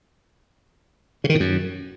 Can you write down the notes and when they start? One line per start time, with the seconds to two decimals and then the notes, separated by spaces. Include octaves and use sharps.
1.24 C#3
1.29 D#3
1.35 A2
1.40 F#2